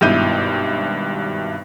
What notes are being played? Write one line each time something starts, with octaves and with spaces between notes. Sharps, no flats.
G#1 G2 B2 E4 G6 D#7